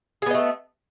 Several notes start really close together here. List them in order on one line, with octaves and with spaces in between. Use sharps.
G#4 B3 D#5 A3